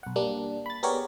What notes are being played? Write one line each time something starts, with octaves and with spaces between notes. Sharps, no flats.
B1 F#5
G3 A#3 D4
B5 A6
B3 G4 G#4 A#4 C#5 D5